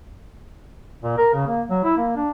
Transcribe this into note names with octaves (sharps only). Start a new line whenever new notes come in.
A#2
A#4
C#3
A#3
F#3
E4
A#3
D4